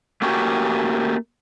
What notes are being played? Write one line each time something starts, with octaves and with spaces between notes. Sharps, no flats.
A3 A#3 C#4 F#4 G4